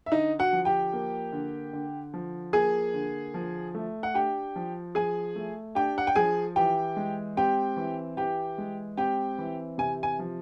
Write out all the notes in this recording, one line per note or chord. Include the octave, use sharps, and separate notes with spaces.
E5
D3 D#4 D#5
F#4 F#5
F3
G4 G5
A#3
D3
D3
F3
A#3 G#4 G#5
D3
F3
A3
F#5
D4 G4 G5
F3
F3 G#4 G#5
A3
D4 G4 G5
F#5
G5
F3 G#4 G#5
E3 G4 G5
G#3
C4 G4 G5
E3
E3 G4 G5
G#3
C4 G4 G5
E3
C3 G#5
G#5
F3